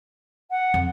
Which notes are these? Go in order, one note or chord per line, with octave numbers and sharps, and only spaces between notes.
F#5
F2